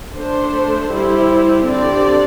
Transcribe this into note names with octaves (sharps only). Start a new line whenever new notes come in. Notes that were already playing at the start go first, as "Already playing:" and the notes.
A3 D4 C5
G3 E4 G4 C5
D3 C4 G4 D5